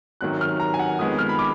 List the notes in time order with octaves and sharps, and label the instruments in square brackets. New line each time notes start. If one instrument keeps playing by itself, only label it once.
[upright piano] G#1 F#2 D#3 F#3 F#6
F6
A#5
G#5
F#5
F2 D#3 G#3 B3 D#6
F6
B5
D6